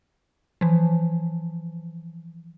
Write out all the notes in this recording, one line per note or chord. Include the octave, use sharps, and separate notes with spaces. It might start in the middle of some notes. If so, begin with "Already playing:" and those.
E3 F3